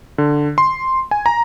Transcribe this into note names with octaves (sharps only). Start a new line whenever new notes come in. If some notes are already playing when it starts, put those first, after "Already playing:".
D3
C6
G#5
A#5